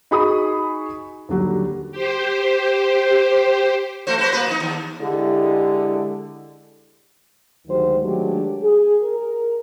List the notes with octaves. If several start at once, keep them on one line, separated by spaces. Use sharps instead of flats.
D#4 F#4 G#4 B5 C#6 D#6
D#2 D3 F#3 G3
G4 C5
A3 F#4 C5
F#4 B4 C5
A#3 B4
B2 D#4
D#2
D3 G#3 E4 G4
D2 G#2 D#3 F#3 G4 C5
D#3 F#3 G#3 A3 D4 G4
G#4
A#4